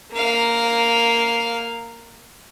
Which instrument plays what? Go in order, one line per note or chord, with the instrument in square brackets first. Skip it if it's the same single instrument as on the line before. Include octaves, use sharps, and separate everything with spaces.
[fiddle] A#3 F5